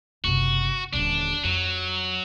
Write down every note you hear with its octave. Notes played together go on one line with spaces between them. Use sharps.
F#1 C3 F#4
D#1 D3 D4
F2 F#3